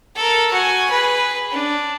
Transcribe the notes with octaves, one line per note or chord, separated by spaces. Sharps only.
A4 A#4
F#4 G#5
G#4 B4
D4